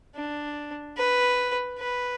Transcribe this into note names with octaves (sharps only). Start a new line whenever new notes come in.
D4
B4
B4